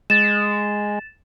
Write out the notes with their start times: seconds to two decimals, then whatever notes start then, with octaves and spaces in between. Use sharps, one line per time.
0.10 G#3 A6 E7